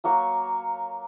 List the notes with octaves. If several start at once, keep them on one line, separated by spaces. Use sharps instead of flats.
F#3 A#3 F#4 C#5